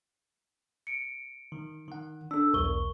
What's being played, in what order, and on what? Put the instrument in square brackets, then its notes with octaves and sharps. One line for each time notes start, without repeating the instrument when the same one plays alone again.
[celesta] C#7 D7
[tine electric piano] D#3
D#3 F#5
[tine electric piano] D4 A4 [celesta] E6
[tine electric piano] B1 E2 [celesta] A#4 C#6 G7